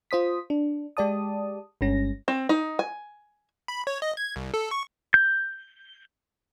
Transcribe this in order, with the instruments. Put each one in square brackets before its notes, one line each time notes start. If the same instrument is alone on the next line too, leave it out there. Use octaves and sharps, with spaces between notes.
[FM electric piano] F4 C5 D#6 B6
D4
G#3 G4 D5 A5 D#6
G1 G2 G#3 C#4 A#6
[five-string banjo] C4
D#4
G#5
[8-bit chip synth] B5
C#5
D#5
G#6
C2
A4
C#6
[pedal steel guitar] G6